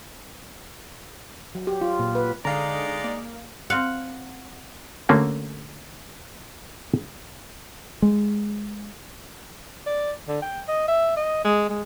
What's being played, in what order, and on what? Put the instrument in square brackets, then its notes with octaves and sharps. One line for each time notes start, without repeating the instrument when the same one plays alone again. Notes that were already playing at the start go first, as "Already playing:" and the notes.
[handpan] F#3
G4
F4
A#2
B4
[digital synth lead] D3 [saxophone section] G#3 D#4 D5 [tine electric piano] F5 A#5
[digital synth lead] A#3
[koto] C4 F4 F5 [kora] F#5
[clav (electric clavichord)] D3 A3 A#3 C#4 F#4
[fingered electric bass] G#3
[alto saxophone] D5
D3
G5
D#5
E5
D#5
G#3
G#3